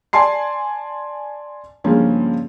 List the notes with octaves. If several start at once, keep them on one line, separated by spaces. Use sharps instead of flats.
D5 G#5 A5 C6 C7
G2 C#3 F3 G#3 A#3 C#4